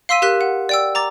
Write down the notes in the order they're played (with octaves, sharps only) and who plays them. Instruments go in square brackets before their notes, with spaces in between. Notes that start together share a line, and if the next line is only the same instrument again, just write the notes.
[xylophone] F5 C6 E6 B6 D#7
G4 A#4 F#6 B6
F#5
D5 G5 E6
A#5 D6 A6